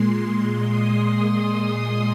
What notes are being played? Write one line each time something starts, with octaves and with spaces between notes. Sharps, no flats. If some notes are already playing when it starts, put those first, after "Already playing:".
Already playing: A#2 G#3 C6
D#6